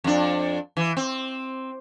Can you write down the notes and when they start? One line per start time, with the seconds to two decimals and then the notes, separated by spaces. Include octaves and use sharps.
0.04 F2 D4
0.77 E3
0.97 C4